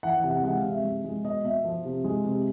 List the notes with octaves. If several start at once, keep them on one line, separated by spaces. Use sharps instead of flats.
E3 F#5
F#5
C3
F#5
G#3 F#5
F5
C3
E5
G#3
G#3
B2 D#5
B2 E5
F3
C3
G#3
C3